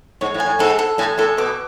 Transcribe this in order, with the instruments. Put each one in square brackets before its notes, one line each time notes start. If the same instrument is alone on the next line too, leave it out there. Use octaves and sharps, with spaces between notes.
[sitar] G#2 [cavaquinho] C#5
[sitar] A2
[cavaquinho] G#5
[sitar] A2
[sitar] G#2 [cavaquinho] A4
[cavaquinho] A4
[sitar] A2 [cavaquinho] G#5
[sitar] A2 [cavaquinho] A4
[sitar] B2 [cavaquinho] D6